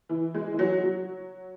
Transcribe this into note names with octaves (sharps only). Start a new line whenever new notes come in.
E3
G#3
E3
F#3
F#3